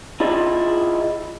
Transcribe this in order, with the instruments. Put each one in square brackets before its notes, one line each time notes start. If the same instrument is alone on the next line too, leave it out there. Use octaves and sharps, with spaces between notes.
[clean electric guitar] E4 F4 G#4 D5 D#5